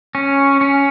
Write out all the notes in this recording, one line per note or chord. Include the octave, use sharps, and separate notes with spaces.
C#4
C#4